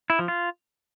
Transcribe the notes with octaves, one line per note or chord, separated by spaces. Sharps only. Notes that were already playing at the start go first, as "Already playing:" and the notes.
E4
F3
F4